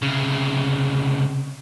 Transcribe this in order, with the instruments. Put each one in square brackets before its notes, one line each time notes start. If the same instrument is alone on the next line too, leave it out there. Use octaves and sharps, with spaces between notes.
[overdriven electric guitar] C2 C#3